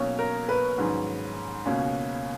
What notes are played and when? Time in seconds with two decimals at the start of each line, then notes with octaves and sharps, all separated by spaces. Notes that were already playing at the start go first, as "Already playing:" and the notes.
Already playing: B1 B2 A#3 C#4 C#5
0.19 A#4
0.49 B4
0.78 A#1 G#2 D#3 F#3 C#4
1.65 C#2 B2 A#3 C#4